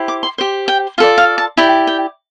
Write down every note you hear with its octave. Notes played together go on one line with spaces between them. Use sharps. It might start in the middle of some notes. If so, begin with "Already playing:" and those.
Already playing: E4 G4 C5
D6
C6
G4 C5
G5
F4 A4 D5 F5
F5
A5
E4 G4 D5 G5
G5